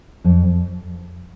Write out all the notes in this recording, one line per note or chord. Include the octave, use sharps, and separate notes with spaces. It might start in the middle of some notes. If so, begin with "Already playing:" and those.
F2